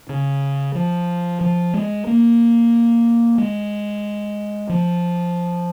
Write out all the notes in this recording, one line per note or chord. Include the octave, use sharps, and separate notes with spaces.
C#3
F3
F3
G#3
A#3
G#3
F3